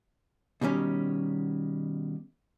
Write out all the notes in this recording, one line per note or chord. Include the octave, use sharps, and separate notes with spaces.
B2 D#3 G3 C#4